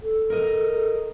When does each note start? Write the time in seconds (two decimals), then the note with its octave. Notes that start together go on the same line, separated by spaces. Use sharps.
0.01 A4
0.30 A#4 D#5